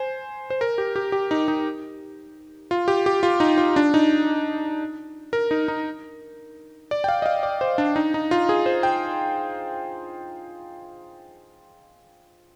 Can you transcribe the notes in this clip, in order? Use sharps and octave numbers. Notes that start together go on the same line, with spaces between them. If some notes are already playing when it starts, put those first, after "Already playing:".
Already playing: C5 G#5
C5
A#4
G4
G4
G4
D#4
D#4
F4
G4
G4
F4
D#4
F4
D4
D#4
A#4
D#4
D#4
D5
G5
F5
D#5
F5
D5
C5
D4
D#4
D#4
F4
G#4
C5
G5